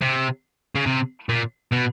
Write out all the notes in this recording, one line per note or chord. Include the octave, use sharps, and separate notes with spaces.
C3
C#3
C3
A#2
B2